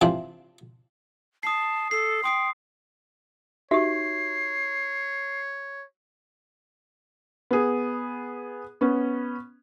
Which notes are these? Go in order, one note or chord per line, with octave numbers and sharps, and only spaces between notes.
C3 E3 F3 C4 D4
A5 D#6 C7
A4 C7
G5 C6 D#6 C7
D#4 F#4 G4 C#5 E5 C7
B3 G#4
B3 C#4